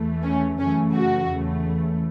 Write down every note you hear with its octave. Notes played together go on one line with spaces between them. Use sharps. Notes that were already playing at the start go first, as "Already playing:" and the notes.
Already playing: E2 E3 A3
C#4
F#2 C#3 E3 A3 C#4
F#4
E2 C#3 E3 A3